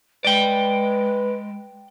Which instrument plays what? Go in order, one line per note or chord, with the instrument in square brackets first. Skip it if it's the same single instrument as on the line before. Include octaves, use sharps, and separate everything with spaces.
[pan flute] G#3 [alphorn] B4 [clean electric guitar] D5 G5